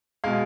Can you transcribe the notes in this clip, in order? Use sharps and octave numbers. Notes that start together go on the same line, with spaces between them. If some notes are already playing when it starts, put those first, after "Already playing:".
B2 G#3 F5